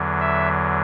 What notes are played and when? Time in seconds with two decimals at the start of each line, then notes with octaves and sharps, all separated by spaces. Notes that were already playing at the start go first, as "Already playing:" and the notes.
Already playing: E2 D3 F#3
0.20 E5